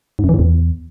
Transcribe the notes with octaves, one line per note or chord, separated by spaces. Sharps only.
G#2
F#2
E3
A2
E2